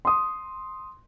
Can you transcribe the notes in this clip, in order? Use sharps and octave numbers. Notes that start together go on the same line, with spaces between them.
C6 D#6